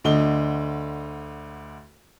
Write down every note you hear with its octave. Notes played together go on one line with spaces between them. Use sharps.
D2 D3 D#5 G7